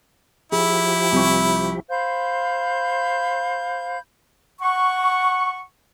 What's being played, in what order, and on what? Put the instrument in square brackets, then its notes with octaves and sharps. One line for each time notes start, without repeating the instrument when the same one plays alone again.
[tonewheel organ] F3 G4 [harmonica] E4 [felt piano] G#4
[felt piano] C2 C#6
[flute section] C5 F5 B5 G6
[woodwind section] F#5 C#6